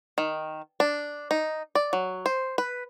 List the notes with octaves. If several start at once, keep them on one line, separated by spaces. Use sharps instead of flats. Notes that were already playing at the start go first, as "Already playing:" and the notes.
D#3
D4
D#4
D5
F#3
C5
B4